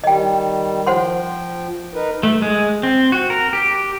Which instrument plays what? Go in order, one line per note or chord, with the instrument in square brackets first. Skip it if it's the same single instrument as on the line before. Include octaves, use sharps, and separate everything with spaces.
[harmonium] D#3 G3 [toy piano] D#5 G5
[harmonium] F3 G5 [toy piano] C5 F#5 C6
[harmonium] D#4 A#4 B4
[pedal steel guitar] A3
G#3
C4
F#4
A#4
G4